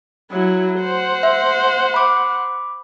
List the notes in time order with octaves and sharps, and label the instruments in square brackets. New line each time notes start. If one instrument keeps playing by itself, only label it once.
[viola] F#3 E4
C5 F#5
[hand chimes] E5
B5 D6